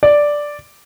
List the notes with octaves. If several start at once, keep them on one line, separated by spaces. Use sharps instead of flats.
D5